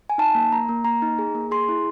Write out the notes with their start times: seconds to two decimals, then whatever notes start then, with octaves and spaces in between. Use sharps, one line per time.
0.10 G#5
0.18 D#4 A5
0.35 A#3
0.52 A#3 A#5
0.69 A#3
0.85 A#3 A#5
1.02 D#4
1.19 G#4
1.35 A#3
1.51 G#4 C6
1.69 E4